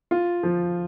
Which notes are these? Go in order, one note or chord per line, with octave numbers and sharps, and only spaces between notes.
F4
F3